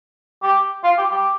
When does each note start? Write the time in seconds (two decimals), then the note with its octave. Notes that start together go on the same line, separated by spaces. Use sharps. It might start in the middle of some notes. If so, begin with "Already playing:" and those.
0.43 G4
0.84 F4
0.98 G4
1.11 G4